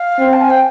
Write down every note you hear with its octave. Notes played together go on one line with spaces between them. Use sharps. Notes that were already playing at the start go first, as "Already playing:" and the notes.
Already playing: F5
C4
A5
G#5
G5